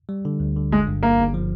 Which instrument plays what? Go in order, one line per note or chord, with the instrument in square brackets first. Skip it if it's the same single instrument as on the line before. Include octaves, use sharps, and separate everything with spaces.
[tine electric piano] G3
D3
D2
D3
[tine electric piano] G1 [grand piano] G#3
[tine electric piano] G2
[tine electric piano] G1 [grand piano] A#3
[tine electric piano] G1
F3